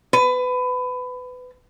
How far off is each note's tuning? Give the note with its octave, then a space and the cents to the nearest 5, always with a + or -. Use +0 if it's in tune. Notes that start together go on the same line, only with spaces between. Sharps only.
B4 +25